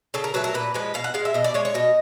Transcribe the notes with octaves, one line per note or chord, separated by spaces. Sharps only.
C#3 A4
A#4
F#3 A3 B4
A#4
A#2 B4
F3 G#3 B4
B2 F5
F#5
G#3 F5
E5
B2 D#5
D5
G#3 C#5
C#5
B2 D#5